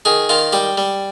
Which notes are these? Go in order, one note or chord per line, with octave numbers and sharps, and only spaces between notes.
D#3 G#4
D#3 F4
G3 G4
G3